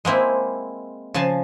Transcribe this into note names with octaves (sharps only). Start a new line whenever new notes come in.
G#3 A#3 C4 E4
C#3 F3 G#5 A5